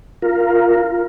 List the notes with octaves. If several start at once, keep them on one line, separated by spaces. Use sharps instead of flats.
F4 A#4